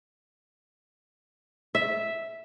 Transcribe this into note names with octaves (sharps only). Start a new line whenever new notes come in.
E5